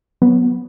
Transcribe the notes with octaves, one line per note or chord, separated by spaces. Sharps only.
F#3 B3